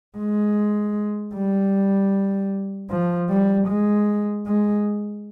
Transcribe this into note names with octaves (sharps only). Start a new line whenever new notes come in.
G#3
G3
F3
G3
G#3
G#3